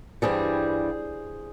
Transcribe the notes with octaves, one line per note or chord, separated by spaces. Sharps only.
G2 E3 G3 G#4 C5